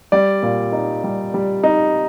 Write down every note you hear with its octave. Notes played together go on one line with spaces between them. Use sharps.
G3 D5
A#2
D#4
G3
G3
D#4